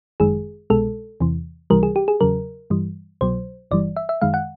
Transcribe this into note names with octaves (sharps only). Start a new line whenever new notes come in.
G1 F#2 D#3 G#3 G#4
C2 B2 G#3 A4
E2 C3 E3
C#2 C3 E3 G3 A#4
G#4
G4
G#4
E2 C#3 F#3 A#4
G2 E3 G3
C2 B2 F#3 C5
G1 G2 E3 G3 D5
E5
E5
F#2 D#3 G#3 F5
F#5